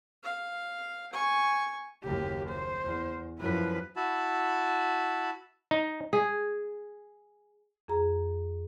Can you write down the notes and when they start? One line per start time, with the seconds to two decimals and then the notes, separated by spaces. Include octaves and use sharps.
0.23 F5
1.13 G#5 C#6
2.04 F#1 D#2 G4
2.49 C5
2.84 E2
3.39 F#2 F3 E4 B4
3.96 E4 F#4 A5 B5
5.71 D#4
6.13 G#4
7.88 F2 G#4 A#5